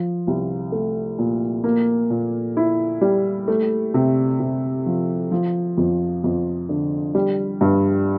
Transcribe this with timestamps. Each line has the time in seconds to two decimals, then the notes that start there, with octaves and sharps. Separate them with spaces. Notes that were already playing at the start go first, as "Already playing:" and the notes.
Already playing: F3
0.27 C2
0.72 A3
1.18 A#2
1.64 A#3
2.10 A#2
2.57 E4
3.01 G3
3.48 A3
3.94 C3
4.40 C3
4.86 F3
5.31 F3
5.77 F2
6.24 F2
6.69 D3
7.15 G3
7.61 G2